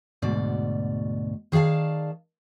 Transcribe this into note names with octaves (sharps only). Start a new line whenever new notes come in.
D2 G#2 B2 D5
D#3 G#4 D5 F5 A5